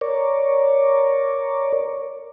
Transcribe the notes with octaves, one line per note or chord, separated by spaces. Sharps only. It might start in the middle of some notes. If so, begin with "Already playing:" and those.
A#4 C#5 D5